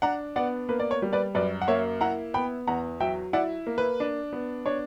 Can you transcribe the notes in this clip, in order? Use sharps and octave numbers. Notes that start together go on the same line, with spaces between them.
D4 F#5 A#5
B3 D5 F#5
A#3 B4
D5
C#5
G3
B4 D5
F#2 B4 D5
F#5
A#3 C#5 E5
E4 F#5 A#5
B3 G5 B5
E2 F#5 A#5
F#3 E5 G5
E4 D5 F#5
A#3
B4
D4
B3
D4 C#5